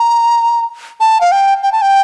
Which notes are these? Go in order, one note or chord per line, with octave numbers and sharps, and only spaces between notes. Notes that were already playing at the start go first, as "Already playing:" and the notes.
Already playing: A#5
A5
F5
G5
G5
A5
G5